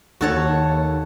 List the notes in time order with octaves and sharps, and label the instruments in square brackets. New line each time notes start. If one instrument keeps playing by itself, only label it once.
[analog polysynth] D#2 [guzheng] F#4 A4 C#5